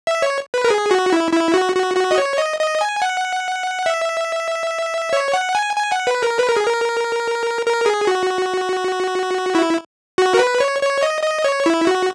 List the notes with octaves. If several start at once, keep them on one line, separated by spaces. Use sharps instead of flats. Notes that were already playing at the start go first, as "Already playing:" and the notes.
E5
C#5
B4
A#4
G#4
F#4
E4
E4
F#4
F#4
F#4
D#5
C#5
D#5
D#5
G#5
F#5
E5
C#5
F#5
G#5
G#5
F#5
B4
A#4
B4
A#4
G#4
A#4
A#4
G#4
F#4
E4
F#4
A#4
B4
C#5
C#5
D#5
D#5
C#5
E4
F#4